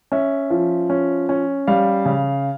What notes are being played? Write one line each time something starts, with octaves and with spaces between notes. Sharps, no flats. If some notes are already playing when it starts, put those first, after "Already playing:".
C#4 E5
F3
C#4
C#4
G3 F5
C#3